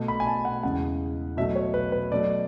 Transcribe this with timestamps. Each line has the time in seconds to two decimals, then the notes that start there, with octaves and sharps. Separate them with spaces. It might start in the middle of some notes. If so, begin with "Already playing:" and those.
Already playing: B2 A3
0.08 B5
0.20 G#5
0.27 A5
0.45 F#5
0.63 E2 C#3 G#3 F#5
1.37 B2 F#3 A3 E5
1.56 C#5
1.74 B4
1.92 B4
2.11 B2 F#3 A3 D5